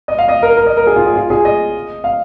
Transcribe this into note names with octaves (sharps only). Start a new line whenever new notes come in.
D#5
F5
D#5
A#4
A#4
D#5
A#4
G#4
F4
G#4
F4
G#4
D#5
F5